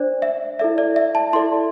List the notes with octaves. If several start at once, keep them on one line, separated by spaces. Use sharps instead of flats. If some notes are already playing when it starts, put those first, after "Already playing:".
Already playing: D4 C5 D5
E5
E4 A4 D5 E5
D5
E5
A5
E4 A4 D5 C6